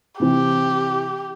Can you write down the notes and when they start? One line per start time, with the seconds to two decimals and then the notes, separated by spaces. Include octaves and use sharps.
0.20 C3 E3 C4 G4